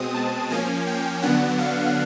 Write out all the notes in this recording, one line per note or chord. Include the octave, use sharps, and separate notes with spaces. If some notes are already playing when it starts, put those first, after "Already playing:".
Already playing: B2 G#3 C4 D#6
A5
F3 A#3 C#4 G#5
G5
D3 F#3 B3 D4 F#5
F5